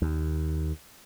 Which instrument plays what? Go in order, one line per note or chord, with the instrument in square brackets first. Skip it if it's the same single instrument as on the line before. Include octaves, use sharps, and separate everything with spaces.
[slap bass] D#2